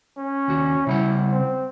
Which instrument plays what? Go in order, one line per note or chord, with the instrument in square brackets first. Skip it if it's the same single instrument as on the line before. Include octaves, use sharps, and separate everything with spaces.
[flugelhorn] C#4
[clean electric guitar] D#2 F#4
[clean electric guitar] C#3 G3 F#5 [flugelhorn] E4
[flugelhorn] C4